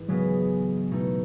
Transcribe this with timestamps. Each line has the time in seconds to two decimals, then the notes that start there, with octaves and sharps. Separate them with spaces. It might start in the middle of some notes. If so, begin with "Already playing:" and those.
Already playing: G#2 E3
0.09 C#3 F#3 G#3 B3
0.91 B2 A3 D#4